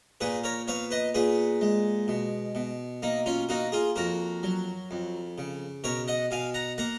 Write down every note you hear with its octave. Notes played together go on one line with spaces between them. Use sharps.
A#2 G#4 B4
A#4 C#5
B3 C#5 F5
B4 D#5
A#2 G#4 B4
G#3
B2
B2
A#3 D#4
C#4 F4
A#3 D#4 F#4
F4 G#4
F2 F#4 A#4
F#3
F2
C#3
B2 A#4 C#5
D#5 F#5
B2 F5 G#5
F#5 A#5
A#3 F#5 A#5